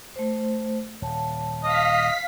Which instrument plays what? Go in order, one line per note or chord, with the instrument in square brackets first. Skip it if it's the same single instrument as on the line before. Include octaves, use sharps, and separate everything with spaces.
[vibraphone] A3 C5
[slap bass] D#1 [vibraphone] C#5 A5
[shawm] D#5 [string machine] F5 B6